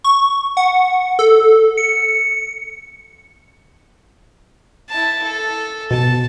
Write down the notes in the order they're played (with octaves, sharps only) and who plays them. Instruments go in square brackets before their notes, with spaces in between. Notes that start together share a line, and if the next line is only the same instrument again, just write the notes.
[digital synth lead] C#6
F#5
A4
C#7
[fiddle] E4 A5
A4
[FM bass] B2 [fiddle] A5